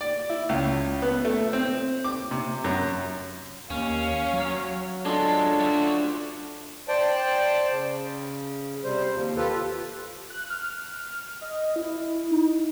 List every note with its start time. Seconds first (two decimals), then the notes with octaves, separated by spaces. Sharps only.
0.01 D5
0.30 E4
0.49 C#2
1.02 B3
1.25 A3
1.53 C4
2.04 D6
2.31 C3
2.64 F#2
3.70 D#2 C#4 F5
4.33 F#3
5.05 G#3 D4 F4 A4
5.60 A3 F#4
6.88 C5 D5 G5 A5
7.71 C#3
8.84 C3 G3 C5
9.14 D#2 F3
9.36 F4 G4 A4 B4
10.30 F#6
10.50 F6
11.41 D#5
11.76 E4
12.31 D#4